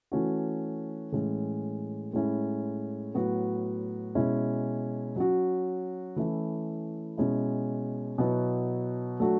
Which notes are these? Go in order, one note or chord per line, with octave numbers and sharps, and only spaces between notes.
E3 A3 C#4 F#4
A2 E3 G#3 C#4 E4
A2 G#3 C#4 E4
A2 F#3 B3 F#4
B2 G#3 C#4 E4
F#3 C#4 F#4
E3 A3 C#4 E4
B2 G#3 C#4 E4
B2 F#3 B3 E4
F#3 A3 D4 F#4